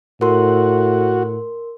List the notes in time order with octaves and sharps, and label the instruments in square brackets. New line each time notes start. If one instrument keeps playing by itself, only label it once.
[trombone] A2 [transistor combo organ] F#4 [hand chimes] A#4 C6